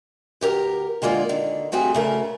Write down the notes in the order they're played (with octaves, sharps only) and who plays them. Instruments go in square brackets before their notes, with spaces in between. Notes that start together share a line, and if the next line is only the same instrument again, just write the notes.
[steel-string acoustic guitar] D2 G4 A#4 A#5
D3 G#3 A#3 F4 D5
D3 D#3
G3 A3 C4 F#4 G#4
C#3 A3 A#4